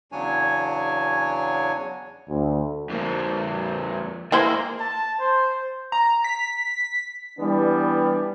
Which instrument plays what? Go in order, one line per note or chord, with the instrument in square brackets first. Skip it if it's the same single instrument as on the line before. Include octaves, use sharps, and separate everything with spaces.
[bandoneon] E2 C#3 F#3 D4 C#5 G#5
[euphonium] D2
[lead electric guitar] F2 A#3
[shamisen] E3 E4 C5 [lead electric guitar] A#3
[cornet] A5
C5
[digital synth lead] A#5
B6
[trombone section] E3 G3 B3 D4